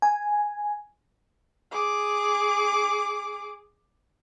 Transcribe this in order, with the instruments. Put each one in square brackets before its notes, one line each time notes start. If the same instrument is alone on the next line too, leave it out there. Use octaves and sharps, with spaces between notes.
[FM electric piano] G#5
[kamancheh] G#4 D6